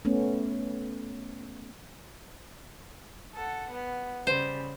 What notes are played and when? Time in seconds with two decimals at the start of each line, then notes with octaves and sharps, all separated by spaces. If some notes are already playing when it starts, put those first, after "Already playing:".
0.05 A3 B3 C#4
3.34 A4 F#5
3.71 B3
4.27 C#3 G3 C5